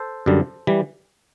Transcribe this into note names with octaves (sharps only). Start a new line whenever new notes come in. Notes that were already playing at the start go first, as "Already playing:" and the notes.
Already playing: A4 C5
F#2 D3 G3
E3 G3